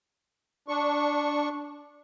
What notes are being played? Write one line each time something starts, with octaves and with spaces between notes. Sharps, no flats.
D4 C#6